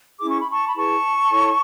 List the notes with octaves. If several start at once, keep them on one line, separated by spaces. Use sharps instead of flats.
C#4 E4 G#4 D6
C#6
B5
A5 C#6
B5
E4 G#4 B4 A5 C#6
E4 A4 C#5